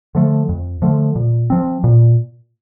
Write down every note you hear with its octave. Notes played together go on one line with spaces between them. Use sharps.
D3 F3 A3
F2
D3 F3 A3
A#2
F3 C4
A#2